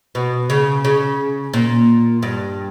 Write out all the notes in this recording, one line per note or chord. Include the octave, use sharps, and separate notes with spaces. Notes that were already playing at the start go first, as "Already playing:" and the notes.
B2
C#3
C#3
A#2
G2